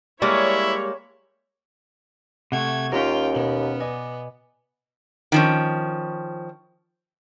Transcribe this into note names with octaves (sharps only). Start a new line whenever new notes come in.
G3 G#3 A#3 E4 C#5
C3 A3 F#5 C#6 G#6
D#2 C#4 F4 A#4 G5
B2 B3
D5 D#5 G#5
D#3 F3 C#4